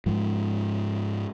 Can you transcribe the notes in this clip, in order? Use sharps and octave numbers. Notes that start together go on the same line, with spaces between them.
G#2 F3